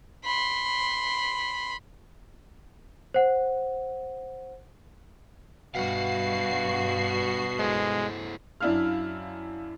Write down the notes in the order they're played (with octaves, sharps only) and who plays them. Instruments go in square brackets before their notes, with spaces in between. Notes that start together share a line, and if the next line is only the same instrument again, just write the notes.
[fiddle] B5 C6
[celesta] C5 F#5
[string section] G2 F#4 C7 [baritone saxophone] B2 [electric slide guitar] F5 F#5
[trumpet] G#3 [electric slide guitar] E4 A4 C5
[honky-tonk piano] F#2 D4 E4 F5 F6